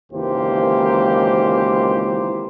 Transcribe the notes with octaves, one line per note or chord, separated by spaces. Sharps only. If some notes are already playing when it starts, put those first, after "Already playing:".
G#1 C#2 E3 A#3 G4 C5